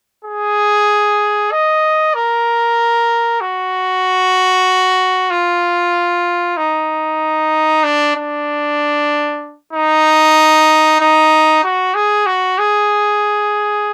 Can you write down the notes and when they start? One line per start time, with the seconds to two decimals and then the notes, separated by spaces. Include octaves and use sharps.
0.25 G#4
1.52 D#5
2.15 A#4
3.41 F#4
5.30 F4
6.57 D#4
7.84 D4
8.16 D4
9.73 D#4
11.01 D#4
11.64 F#4
11.94 G#4
12.26 F#4
12.59 G#4